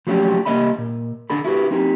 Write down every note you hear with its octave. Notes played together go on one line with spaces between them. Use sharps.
F3 F#3 A3 C#4 G4
C2 G3 A#3 D#5 E5 B5
A#2
D3 D4 A4 B5
E4 F#4 G4 B4
C4 D#4 G4